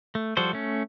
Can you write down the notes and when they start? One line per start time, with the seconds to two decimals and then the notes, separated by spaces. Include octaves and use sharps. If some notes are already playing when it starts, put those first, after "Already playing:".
0.15 A3
0.37 F3 G3 F#4 A4 C5
0.53 A3 C#4